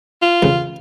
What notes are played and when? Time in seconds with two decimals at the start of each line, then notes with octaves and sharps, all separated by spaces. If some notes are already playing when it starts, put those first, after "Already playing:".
0.22 F4
0.42 A1 C#3